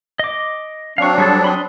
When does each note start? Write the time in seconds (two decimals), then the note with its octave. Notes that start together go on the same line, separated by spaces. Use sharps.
0.19 D#5 D6
0.98 F#3 C4 D4 F5 C#6
1.18 G3 G#4 A4
1.44 B5 C6 D#6